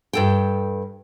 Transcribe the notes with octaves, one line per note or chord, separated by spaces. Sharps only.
G2 A4 G5